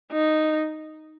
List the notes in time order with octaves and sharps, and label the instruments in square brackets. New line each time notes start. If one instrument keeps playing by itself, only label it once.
[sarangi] D#4